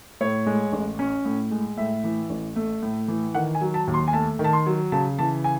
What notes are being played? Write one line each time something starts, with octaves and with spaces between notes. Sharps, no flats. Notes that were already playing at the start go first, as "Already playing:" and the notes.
A2 C#5
G#3
A1
C#4
A2
G#3
A2 E5
E3
A1
A3
A2
E3
D#3 F#5
G#5
F#3
A5
D#2
C6
G#5
A3 A5
D#3
A5
C6
F#3
C#3 A5
E3 A5
G#5